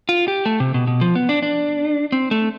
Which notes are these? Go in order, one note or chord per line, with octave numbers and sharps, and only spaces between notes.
F4
G4
A3
C3
B2
B2
F3
B3
D4
D4
C4
A3